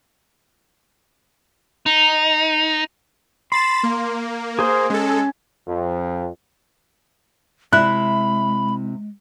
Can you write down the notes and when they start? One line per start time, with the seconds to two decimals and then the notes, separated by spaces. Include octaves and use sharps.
1.86 D#4
3.52 B5 C6 A6 E7
3.83 A#3
4.59 G#4 C5
4.90 G#3 C#4 A4
5.67 F2
7.73 C3 G#3 E4 B5 F#6